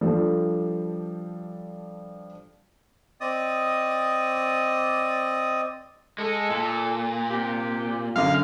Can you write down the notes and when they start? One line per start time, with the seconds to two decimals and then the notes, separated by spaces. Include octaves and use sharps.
0.01 F3 G3 D4 A4
3.21 C4 D5 D#5 D#6
6.18 G#3 A4
6.50 A#2
7.30 C3 G4
8.16 F#2 D3 F5